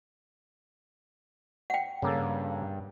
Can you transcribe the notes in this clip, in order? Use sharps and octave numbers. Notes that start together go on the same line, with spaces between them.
F#5 G5
G2 C#3 A#3 A4